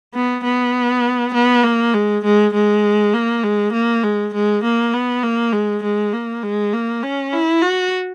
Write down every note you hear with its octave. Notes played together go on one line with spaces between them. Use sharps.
B3
B3
B3
A#3
G#3
G#3
G#3
A#3
G#3
A#3
G#3
G#3
A#3
B3
A#3
G#3
G#3
A#3
G#3
A#3
C#4
E4
F#4